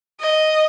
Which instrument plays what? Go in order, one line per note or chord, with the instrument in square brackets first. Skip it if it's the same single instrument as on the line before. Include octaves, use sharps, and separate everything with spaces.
[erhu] D#5